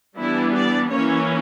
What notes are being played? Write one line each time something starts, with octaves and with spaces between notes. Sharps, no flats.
E3 G3 B3 D4 E4
D5
E3 A#3 C#4 C#5